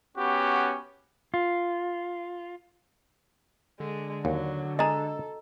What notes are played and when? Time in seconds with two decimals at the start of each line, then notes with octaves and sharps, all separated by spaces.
0.17 B3 C#4 F#4 G4
1.34 F4
3.80 D3 G#3
4.25 D#2 F#3
4.79 G#3 G#4 A4 D#5 A#5